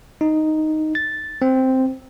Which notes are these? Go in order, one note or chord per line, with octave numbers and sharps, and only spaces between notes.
D#4
A6
C4